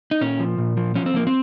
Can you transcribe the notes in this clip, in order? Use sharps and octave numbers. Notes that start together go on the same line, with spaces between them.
D#4
A#2 C#4
F3
A#2
F3
F3 C#4
C4
F3 A#3
C4